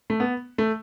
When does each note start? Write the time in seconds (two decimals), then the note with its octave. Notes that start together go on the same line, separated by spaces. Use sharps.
0.10 A3
0.20 B3
0.58 A3